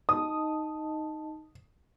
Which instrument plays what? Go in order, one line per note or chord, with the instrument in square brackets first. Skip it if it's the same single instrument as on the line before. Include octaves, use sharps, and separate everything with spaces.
[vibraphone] D#4 D#5 A5 [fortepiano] D#6